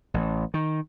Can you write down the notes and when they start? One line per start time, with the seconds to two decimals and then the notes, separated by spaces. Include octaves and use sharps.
0.14 A1
0.54 D#3